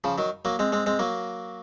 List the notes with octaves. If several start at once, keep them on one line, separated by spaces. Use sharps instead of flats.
C#3 F3
D#3 F#3
F#3 A#3
G#3 C4
G#3 C4
G#3 C4
F#3 A#3